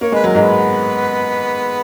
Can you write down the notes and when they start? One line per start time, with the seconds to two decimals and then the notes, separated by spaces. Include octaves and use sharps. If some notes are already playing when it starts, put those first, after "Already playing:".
0.01 A#3 C#5
0.12 G#3 B4
0.24 F#3 A#4
0.35 G#2 G#3
0.41 B3 B4